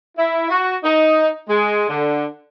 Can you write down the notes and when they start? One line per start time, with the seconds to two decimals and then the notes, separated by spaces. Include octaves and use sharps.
0.18 E4
0.49 F#4
0.83 D#4
1.48 G#3
1.89 D3